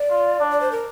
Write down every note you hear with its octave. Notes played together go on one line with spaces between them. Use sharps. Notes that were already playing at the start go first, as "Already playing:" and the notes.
Already playing: D5
F4
D4
D5
C5
A#4